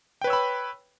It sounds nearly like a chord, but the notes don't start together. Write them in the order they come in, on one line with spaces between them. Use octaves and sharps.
G5 B4 C#5 E6 B5